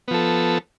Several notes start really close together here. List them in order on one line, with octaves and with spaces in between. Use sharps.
B3 F3 A4